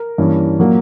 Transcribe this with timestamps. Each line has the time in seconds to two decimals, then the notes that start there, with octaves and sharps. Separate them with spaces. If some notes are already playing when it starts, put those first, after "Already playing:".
Already playing: A#4
0.18 G2 E3 A#3 C#4
0.59 A#2 F#3 A#3